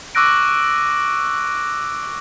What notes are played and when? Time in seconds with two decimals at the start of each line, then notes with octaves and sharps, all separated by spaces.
0.15 C#6 D6 E6 F#6 A#6 D7